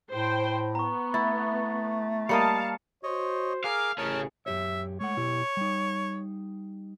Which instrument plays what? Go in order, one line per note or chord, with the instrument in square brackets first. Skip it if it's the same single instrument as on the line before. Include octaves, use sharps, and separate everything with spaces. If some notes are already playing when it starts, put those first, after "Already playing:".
[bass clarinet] A2 [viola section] C5 G5
[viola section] B3 [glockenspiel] A#5 C#6
[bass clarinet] A3 [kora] E4 [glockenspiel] A6
[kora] G3 A#3 D#5 [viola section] F5 A5 [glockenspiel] C#7
[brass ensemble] F#4 C5 [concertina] C#5 D#5
[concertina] G#4 A#4 D6 [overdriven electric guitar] F5
[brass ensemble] A1 G#4 [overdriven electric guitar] C#3 C#4 [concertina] A#4 A5
[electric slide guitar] F#2 G4 C#5 [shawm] E5
[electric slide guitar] G#3 A3 F#5 [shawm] C#5
[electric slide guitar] B2 E4 G4
G3 D#4